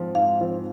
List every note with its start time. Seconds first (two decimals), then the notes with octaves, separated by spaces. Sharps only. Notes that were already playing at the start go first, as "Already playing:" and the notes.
Already playing: G#2 F3 C4 F4
0.15 G#2 F5
0.41 F3 C4 F4